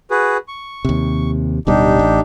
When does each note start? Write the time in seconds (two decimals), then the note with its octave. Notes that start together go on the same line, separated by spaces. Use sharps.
0.11 F#4 G#4 B4
0.48 C#6
0.85 D#2 C3
1.67 D1 B2 G3 D4 D#4 G4
1.99 A1